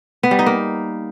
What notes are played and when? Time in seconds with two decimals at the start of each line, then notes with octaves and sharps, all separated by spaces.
0.23 B3
0.31 G3
0.39 D#4
0.46 A#3